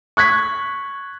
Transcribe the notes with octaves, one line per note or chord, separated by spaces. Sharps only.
C#6 F#6 G#6 B6